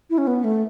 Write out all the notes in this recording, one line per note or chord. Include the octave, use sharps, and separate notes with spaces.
E4
C#4
B3
A3